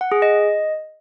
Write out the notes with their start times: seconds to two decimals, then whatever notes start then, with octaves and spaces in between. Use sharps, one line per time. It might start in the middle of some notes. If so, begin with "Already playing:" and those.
0.01 F#5
0.12 G#4
0.22 D#5